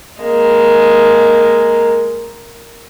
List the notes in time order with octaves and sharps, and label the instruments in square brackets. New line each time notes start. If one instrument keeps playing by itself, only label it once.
[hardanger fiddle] G#3 A#3